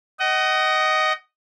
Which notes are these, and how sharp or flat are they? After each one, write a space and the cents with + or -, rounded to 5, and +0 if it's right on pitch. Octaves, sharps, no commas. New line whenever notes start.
D#5 +0 F#5 +35